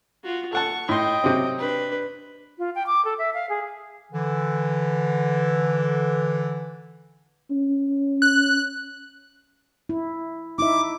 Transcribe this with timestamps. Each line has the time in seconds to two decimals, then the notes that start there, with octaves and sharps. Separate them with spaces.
0.24 F4 F#4
0.53 A4 F#5 A5 C#6
0.89 A2 D#5 G5 C6
1.24 C3 F#3 C4
1.58 D4 B4
2.58 F4
2.75 G5
2.87 D6
3.05 A4
3.19 E5
3.34 F5
3.49 G#4
4.12 D3 E3
7.51 C#4
8.22 F#6
9.89 E4
10.59 D#4 E4 E5 D6